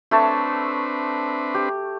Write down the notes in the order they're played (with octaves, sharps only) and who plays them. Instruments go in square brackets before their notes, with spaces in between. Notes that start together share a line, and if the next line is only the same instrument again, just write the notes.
[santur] A3 C#5 A5 [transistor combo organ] C4 D4 B4
[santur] G4